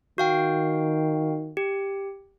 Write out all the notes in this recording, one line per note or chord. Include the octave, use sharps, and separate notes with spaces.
D#3 F#4 F5 G5
G4